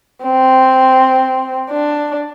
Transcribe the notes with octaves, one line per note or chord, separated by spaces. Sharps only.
C4
D4